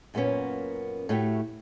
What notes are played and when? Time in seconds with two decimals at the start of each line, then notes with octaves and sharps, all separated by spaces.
0.14 F#2 A#2 A#3 B3 C#4
1.09 A2 A3 F#4 G4